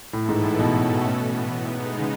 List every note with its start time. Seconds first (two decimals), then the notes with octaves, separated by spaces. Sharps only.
0.13 A2 E3 B3 E4 A4
0.29 G#2
0.43 A2
0.59 B2 A3 C#4 F#4 A4
1.06 A2 E3 B3
1.52 G#3 B3 D#4
1.99 C#3